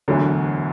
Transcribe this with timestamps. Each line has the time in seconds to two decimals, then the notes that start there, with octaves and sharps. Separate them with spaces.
0.08 E1 D2 D3 F#3